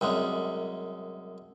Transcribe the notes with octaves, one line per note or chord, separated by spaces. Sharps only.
C2 F#2 G#3